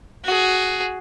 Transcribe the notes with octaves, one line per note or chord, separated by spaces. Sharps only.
F#4 G#4